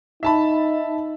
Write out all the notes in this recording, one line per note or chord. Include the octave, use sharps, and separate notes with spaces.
D#4 E5 A5 B5